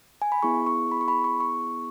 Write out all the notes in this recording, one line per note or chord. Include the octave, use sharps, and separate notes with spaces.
G#5
B5
B3 E4 G#4 C#6
C#6
B5
C#6
B5
C#6
C#6